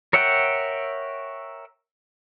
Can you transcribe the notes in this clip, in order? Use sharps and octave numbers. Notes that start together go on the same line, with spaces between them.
A#4 C#5 E5 F#5 G5